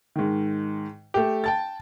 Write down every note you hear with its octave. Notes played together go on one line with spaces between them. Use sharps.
G#2 D#3
A3 G4
G5 A5 A6